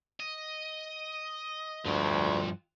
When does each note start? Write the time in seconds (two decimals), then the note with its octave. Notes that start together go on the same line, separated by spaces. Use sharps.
0.20 D#5
1.85 D2 G2 F3 F4 G5